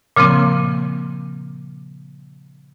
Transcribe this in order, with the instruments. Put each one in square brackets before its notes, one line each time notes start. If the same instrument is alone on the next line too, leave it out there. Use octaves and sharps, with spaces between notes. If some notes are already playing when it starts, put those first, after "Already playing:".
[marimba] A#2 C#3 F3 A#3 C4